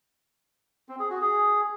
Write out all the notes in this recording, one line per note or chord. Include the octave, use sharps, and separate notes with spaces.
C4
G#4
F#4
G#4